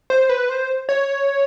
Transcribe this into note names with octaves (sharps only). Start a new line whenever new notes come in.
C5
B4
C5
C#5